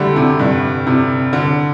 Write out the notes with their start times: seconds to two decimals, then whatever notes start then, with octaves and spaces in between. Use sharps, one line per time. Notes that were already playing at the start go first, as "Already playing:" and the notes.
Already playing: D3 G3 A3
0.16 C3
0.39 G2
0.87 C3
1.33 D3